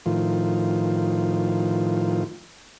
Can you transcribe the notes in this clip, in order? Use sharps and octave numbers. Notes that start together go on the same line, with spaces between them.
A2 D#3 F3 F4